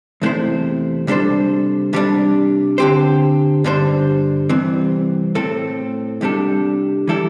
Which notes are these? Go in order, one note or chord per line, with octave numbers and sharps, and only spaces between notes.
E2 C3 A3 E4 C5
C3 G3 D4 A4 C5
C2 C3 G3 D4
D3 C4 G4 C5
G2 D3 G3 D4 C5
C2 C3 E3 C4
A2 A3 C4 A4
C2 C3 G3 D4 A4
E3 G3 E4 A4